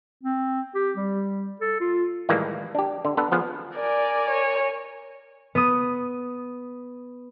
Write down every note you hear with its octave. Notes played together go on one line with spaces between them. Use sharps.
C4
G4
G3
A4
F4
A2 D#3 E3 G3 G#3 A#3
D4 G4
D3
B3 D4 A4 B4
F3 B3 G#4
A#4 D5 G#5
C#5
B3 D#6